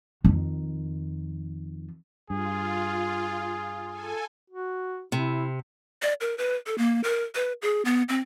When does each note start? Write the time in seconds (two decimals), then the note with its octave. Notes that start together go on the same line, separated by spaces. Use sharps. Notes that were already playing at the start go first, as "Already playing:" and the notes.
0.24 F2 D#3
2.30 G2 F4 G#4
3.89 A4 G#5
4.50 F#4
5.12 C3 E4
6.02 D5
6.21 A#4
6.38 B4
6.66 A4
6.78 A#3
7.04 A#4
7.35 B4
7.62 G#4
7.85 B3
8.09 C4